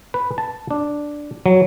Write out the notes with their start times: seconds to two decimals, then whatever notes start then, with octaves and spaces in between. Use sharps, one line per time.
0.14 B4
0.38 A5
0.71 D4
1.46 F#3